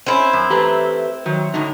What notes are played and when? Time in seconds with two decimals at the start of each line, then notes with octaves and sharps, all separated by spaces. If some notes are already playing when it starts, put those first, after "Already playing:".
0.06 C4 C#4 E4
0.33 F#2
0.50 E3 A3 G4 B4 A#5
1.26 D#3 F#3
1.54 A2 D3 F#3 D#4